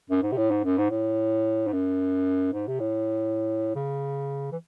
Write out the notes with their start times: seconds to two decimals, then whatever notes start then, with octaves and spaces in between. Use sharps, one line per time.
0.10 F#2
0.23 G#2
0.32 C3
0.37 A2
0.51 G#2
0.64 F#2
0.78 G#2
0.90 A2
1.68 G#2
1.73 F#2
2.53 G#2
2.67 C3
2.80 A2
3.75 C#3
4.52 E3